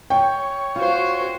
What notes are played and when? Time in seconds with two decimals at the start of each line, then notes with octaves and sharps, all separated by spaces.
0.10 C#5 G5
0.76 F4 F#4 C5